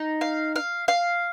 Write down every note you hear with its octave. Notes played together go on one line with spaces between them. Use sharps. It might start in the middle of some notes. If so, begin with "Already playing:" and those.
Already playing: D#4
F5
F5
F5